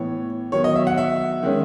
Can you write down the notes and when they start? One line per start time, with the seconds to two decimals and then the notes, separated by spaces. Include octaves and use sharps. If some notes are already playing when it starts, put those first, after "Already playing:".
Already playing: A2 E3 B3 C#5
0.52 D#3 F#3 B3 C#5
0.64 D#5
0.76 E5
0.87 F#5
0.98 E5
1.43 D#3 G#3 C#4